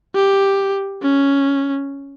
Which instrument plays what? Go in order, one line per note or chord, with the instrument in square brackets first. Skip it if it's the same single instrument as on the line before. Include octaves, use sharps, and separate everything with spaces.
[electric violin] G4
C#4